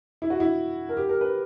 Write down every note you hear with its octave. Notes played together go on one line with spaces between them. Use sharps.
E4
F#4
E4
A#4
G4
A#4
B4